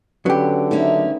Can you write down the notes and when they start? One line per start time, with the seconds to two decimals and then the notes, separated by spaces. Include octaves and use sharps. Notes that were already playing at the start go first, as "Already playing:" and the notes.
0.26 D3 F#3 C#4 G4 B4
0.71 A3 A#3 C#4 D#4